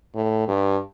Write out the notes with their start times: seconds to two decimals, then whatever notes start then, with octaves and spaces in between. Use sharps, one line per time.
0.15 A2
0.48 G2